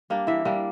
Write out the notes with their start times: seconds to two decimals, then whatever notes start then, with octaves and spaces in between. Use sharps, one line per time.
0.10 G3 A#3 D4
0.27 E3 E5
0.45 G3 A#3 D4